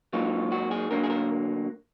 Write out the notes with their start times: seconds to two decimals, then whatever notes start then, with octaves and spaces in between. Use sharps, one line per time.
0.13 G#2 F#3 A#3 D#4 F4
0.52 F#4
0.71 G#4
0.90 D2 D3 F#3 A#3 A#4
1.04 G#4
1.10 A#4